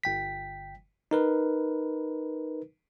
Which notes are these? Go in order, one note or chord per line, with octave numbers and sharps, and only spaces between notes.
G1 G5 B6
D#4 A#4 B4